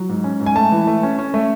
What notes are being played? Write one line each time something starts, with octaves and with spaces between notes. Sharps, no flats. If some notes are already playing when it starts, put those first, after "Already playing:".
Already playing: F#3
G#2
C#4
G#2
G#5
A3 A5
E3
A3
C#4
C#4
A3